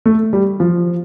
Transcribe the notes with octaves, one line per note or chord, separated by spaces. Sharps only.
A3
G3
F3